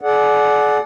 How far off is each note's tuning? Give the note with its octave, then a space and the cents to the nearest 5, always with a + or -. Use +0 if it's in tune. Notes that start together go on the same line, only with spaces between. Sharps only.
G#4 +45 D5 +0 F#5 +0